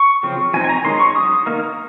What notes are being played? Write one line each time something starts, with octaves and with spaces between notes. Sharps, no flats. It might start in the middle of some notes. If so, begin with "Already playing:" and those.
Already playing: C#6
C#3 F3 C4
F3 C4 D#4 G#5
G#5
A#5
D#3 G#3 C#4 C6
C#6
F#3 C#4 D#6
D#3 A#3 D#4